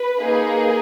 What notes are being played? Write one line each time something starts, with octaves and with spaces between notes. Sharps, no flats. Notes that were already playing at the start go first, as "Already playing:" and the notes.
Already playing: B4
A#3 D#4 G#4